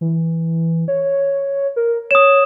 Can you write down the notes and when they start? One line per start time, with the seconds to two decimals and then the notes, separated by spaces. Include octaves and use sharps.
0.01 E3
0.88 C#5
1.76 A#4
2.11 C#5 D#6 E7